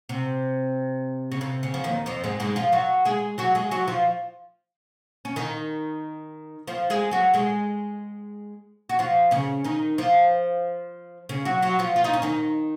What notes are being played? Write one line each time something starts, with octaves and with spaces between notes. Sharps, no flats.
C3
C#3
C3
C#3
F3
D#2 D#3
F2 F3
G#2 G#3
G#2 G#3
F3 F4
F#3 F#4
G#3 G#4
F#3 F#4
G#3 G#4
F#3 F#4
F3 F4
C#4
D#3 D#4
F3 F4
G#3 G#4
F#3 F#4
G#3 G#4
F#4
F3 F4
C#3 C#4
D#3 D#4
F3 F4
C#3 C#4
F#3 F#4
F#3 F#4
F3 F4
F4
D#4
C#4
D#3 D#4